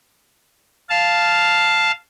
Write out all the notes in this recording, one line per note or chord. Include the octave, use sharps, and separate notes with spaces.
F5 A5